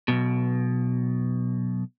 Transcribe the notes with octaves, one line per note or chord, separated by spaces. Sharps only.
B1 G2 B2